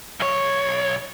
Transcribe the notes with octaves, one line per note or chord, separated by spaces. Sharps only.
B1 C#5